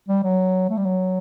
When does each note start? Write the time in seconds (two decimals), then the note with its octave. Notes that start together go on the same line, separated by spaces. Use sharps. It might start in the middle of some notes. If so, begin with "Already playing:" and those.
0.09 G3
0.23 F#3
0.70 A3
0.77 G3
0.85 F#3